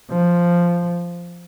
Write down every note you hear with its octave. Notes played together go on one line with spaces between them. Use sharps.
F3